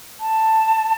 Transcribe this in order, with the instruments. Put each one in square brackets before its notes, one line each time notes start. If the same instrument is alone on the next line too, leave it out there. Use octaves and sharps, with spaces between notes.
[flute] A5